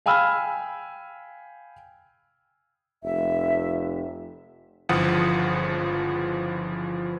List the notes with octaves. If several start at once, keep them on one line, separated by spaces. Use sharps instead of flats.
F5 G5 G#5 B5 E6 F6
F1 E5
G1 C#2 E3 F3 F#5 D#6